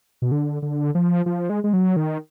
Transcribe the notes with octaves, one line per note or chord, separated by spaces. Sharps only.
B2
D3
D3
F3
F3
G#3
G#3
F#3
D#3